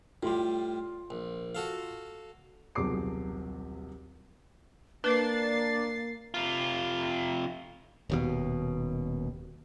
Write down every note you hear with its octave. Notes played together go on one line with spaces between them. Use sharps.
A2 G3 F4 C6
A#1
F#4 A4 F5
D#1 B1 C3 G#4 D6 C7
A#3 D4 B4 A6 C7
C3 F4
D#1 D#2 B2